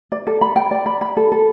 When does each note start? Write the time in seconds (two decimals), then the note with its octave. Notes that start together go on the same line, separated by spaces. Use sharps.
0.12 D5
0.27 A4
0.41 B5
0.56 G5
0.71 D5
0.86 B5
1.01 B5
1.17 A4
1.32 A4